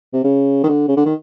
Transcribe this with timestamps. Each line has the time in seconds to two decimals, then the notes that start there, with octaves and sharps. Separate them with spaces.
0.13 C3
0.24 C#3
0.64 D#3
0.68 D3
0.88 C#3
0.97 D3
1.05 D#3